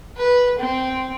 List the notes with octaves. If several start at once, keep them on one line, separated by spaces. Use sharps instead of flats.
B4
C4